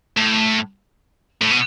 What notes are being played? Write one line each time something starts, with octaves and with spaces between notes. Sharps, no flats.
A2
A2
B2